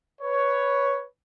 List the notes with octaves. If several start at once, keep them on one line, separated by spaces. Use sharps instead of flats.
B4 C#5